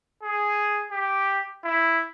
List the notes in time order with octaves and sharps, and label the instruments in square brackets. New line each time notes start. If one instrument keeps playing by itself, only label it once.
[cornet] G#4
G4
E4